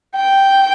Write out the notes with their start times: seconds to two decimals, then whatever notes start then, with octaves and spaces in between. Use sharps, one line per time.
0.16 G5